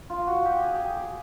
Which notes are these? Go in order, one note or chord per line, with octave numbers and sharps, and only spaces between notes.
F4
F#4
G4
G#4
G4
G#4
G4